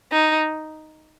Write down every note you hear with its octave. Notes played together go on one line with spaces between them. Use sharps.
D#4